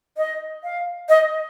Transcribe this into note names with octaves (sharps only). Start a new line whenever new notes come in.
D#5
F5
D#5